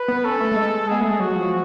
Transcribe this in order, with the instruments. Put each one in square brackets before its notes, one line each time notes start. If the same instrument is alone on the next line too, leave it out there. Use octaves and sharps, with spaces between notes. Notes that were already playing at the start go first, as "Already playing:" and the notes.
Already playing: [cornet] B4
[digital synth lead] B3
[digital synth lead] C#4 [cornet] A4
[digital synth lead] A3
A3
G#3
[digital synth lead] B3 [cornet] G#4
[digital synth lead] A3
G#3
[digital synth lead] F#3 [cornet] F#4
[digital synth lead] F3